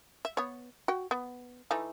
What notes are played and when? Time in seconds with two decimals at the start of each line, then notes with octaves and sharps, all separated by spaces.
0.25 E5
0.37 B3 C#5
0.88 F#4 G5
1.11 B3
1.71 E3 A3 D#4